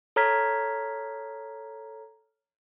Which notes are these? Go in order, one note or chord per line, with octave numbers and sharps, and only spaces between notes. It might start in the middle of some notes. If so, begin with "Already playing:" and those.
A4 C#5 A#5 F6 G#6 B6